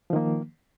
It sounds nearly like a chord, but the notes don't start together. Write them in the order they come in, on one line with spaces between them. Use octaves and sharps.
F3 D#3 A#3